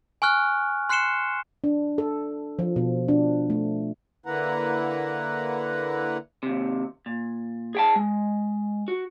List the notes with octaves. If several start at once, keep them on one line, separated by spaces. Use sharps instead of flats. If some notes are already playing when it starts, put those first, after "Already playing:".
G#5 C#6 F6 F#6
C6 F#6 C7 C#7 E7 G7
D4
A4
F3
B2
D4
A3
D3 A#3 E4 B4 F#5 A#5
D#2 C3
A#2
G#4 G5 A5
G#3
F#4